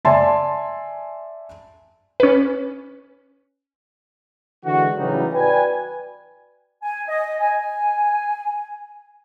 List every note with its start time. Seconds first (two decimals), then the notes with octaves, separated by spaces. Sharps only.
0.05 D5 E5 G#5 A5 C6
2.20 C#4 B4
4.63 D3 E3 G#3 F#4
4.97 A2 C#3 E3 F#3 G3 D#4
5.32 F#4 B4 D5 G5 G#5
6.82 G#5
7.08 D#5
7.40 G#5